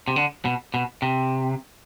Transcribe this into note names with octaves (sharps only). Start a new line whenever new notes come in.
C3
D3
B2
B2
C3